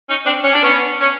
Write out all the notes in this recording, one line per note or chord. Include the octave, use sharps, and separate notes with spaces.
C#4 D#4
C4 D4
C#4
D4
B3 C#4
C#4